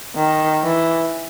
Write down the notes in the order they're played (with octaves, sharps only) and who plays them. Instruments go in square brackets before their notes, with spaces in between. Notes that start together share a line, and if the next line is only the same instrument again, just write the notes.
[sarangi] D#3
E3